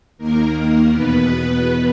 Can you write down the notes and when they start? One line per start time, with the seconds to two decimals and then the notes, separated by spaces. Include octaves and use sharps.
0.18 D#2 D#3 A#3 A#4
0.54 A#3 A#4
0.91 E2 B2 B3 B4